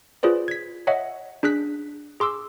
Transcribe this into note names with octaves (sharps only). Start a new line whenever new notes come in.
F4 G#4 B4 C5 D5
G#6 B6
C#5 D#5 E5 F#5
D4 G#4 F#6 B6
G#4 C6 D6 E6